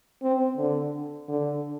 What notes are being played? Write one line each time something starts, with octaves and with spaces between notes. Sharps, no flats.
C4
D3
D3